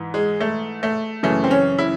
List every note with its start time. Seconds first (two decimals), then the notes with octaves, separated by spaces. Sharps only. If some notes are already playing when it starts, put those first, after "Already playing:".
Already playing: G#2 E3
0.14 G#3
0.40 A3
0.83 A3
1.23 F#2 C#3 E3 A3
1.44 C4
1.51 C#4
1.79 E4